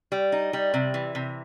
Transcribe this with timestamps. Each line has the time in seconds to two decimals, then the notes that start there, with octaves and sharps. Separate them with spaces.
0.12 G3
0.32 D#4
0.53 G3
0.74 C3
0.94 E3
1.15 C3